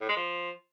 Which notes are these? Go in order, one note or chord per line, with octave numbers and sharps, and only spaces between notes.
A2
G#3
F3